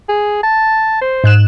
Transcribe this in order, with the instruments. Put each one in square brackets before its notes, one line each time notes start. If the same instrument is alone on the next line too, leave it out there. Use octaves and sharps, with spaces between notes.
[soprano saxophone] G#4
A5
C5
[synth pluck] G#2 F#6 E7